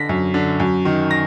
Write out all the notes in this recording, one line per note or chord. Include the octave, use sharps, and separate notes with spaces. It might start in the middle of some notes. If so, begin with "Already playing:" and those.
Already playing: D3 A#6 B6
F#2
D3
F#2
D#3
A#6